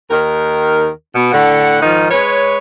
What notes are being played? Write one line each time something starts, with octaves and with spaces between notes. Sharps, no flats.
D#2 D#3 A#4
B2 B3
A2 D3 F#5
G#2 D#3 F3 D#4
G#3 B4 C#5